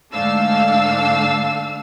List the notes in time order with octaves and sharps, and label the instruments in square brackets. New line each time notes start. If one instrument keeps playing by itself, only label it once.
[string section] G#2 D3 A3 D4 F5 E6